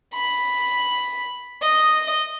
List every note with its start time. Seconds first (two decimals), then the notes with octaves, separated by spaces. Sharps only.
0.14 B5
1.63 D#5